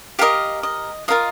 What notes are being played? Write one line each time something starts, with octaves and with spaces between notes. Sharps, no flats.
G4 A#4 D#5 F5
D#5
F4 A#4 D#5 F5